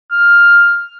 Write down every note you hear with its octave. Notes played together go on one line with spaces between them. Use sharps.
F6